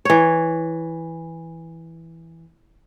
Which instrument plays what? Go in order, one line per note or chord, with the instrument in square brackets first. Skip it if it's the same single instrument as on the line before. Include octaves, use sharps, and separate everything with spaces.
[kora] E3 C#5